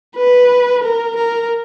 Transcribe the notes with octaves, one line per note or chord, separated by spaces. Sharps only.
B4
A#4
A#4